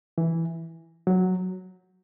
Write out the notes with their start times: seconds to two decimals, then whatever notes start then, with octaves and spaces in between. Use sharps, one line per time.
0.18 E3
1.07 F#3